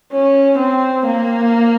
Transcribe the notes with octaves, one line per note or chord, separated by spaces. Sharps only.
C#4
C4
A#3